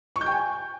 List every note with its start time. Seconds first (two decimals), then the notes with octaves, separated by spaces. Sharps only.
0.16 C#6
0.21 G6
0.26 G5
0.32 G#5